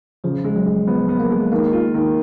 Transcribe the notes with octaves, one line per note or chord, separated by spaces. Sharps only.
C#3 F3
G#3
F#3
G#3
F3 B3
B3
A#3
G#3
D#3 A#3
F4
D#3